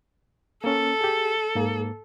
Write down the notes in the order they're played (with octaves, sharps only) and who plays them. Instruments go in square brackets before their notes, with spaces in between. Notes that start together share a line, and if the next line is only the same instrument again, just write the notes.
[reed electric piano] A#3 C#4 [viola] A4
[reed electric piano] G4 G#4
G#2 A#3